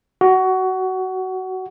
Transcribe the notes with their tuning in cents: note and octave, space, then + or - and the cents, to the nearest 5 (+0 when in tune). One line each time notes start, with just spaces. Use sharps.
F#4 +20